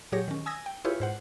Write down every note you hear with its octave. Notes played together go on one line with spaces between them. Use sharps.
A#2 F#3 G4 G#4 C#5 A#6
D#3 C#4
G#5 D#6 E6 G#6 A#6
G5
E4 F4 G4 G#4 B4 C#5
G#2 C5 F#5